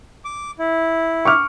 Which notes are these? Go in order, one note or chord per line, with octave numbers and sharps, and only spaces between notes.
D6
E4
C#6 D6 F6